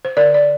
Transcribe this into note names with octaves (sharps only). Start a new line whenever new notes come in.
C5
D3 A#4 D5
D5